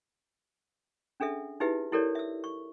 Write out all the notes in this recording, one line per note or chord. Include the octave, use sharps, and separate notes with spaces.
C#4 D4 G#4 A4 E5
D#4 E4 G4 G#4 B4 E5
E4 G4 A4 A#4 C#5 D5
E5 E6
C#6